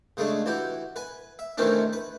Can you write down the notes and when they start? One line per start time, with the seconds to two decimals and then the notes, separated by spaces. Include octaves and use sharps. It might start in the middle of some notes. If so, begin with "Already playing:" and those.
0.17 C#3 G#3 A3 D4
0.46 E3 F#4 G4
0.96 B4 G#5
1.39 E5
1.58 C3 D#3 E3 A3 C#4 D4
1.93 B4